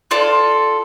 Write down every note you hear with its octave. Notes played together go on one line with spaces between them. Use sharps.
F4 A4 D5